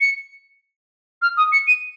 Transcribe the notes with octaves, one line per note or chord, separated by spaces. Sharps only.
C#7
F6
D#6
C#7
D#7